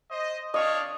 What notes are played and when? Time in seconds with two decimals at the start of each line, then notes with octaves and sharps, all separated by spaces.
0.10 C5 D#5
0.54 D4 C#5 D#5 F5 D#6